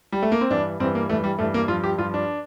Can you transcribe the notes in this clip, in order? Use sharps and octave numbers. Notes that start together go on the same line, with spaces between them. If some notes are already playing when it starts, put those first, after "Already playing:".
G3
A3
A#3
C4
G2 E3 D4
G2 E3 C4
A#3
G2 E3 A3
G3
G2 E3 A3
A#3
G2 F3 F4
G4
G2 F3 F4
D4